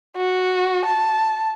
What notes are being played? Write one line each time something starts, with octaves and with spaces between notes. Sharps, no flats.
F#4
A5